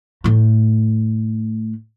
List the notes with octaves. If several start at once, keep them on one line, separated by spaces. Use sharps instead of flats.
A2 A3